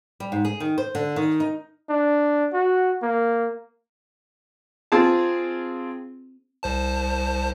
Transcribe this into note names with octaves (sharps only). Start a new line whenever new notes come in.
G3
G#2
G#4
D#3
C5
D3
D#3
D#4
D4
F#4
A#3
C4 F4 G#4 A5
C2 C5 A5